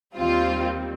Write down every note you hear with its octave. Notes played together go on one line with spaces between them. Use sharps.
D#2 D#3 G3 C4 F4